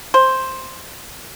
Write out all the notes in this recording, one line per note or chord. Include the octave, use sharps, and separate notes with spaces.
C5